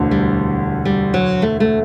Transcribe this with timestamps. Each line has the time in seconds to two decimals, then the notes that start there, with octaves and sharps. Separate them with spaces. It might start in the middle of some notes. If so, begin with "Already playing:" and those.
Already playing: E1 D2 D3
0.11 G3
0.85 G3
1.14 F#3
1.42 A3
1.60 A3